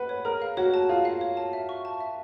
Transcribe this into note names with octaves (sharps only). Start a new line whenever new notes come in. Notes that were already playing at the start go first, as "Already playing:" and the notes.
Already playing: B4 F#5
C#5
G#4 A#4
F5
F#4 C#5
A5
F4 G#4
F5
C#5
A5
E5
C#6
A5
E5